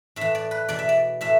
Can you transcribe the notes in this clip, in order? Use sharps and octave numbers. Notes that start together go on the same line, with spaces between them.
A2 E3 E5
D5
B4
E2 B2 D5
E5
D5
A2 E3 E5